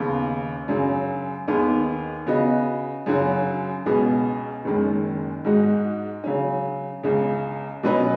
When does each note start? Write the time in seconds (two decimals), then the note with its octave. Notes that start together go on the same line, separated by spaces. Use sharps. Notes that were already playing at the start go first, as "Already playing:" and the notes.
Already playing: D#2 C#3 B3
0.68 F#2 C#3 F#3 C#4
1.48 D#2 D#3 B3 G#4
2.27 C#3 B3 F#4 D#5
3.06 F#2 C#3 F#3 C#4 F#4
3.86 C#2 B2 B3 G#4
4.65 F#1 F#2 D#3 G#3
5.45 G#2 G#3 D#4 F#4
6.24 C#3 F#3 C#4
7.03 C#2 C#3 G#3
7.83 B2 F#3 C#4 B4 D#5